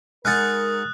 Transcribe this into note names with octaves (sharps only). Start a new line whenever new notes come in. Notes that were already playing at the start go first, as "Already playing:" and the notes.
G#3 D#4 A#4 F#5 D#6 F6 F#6 A6